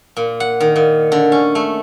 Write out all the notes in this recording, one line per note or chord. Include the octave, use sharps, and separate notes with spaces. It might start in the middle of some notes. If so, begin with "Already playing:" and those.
A#2
F#5
D#3
A#2
D3
C#4
A3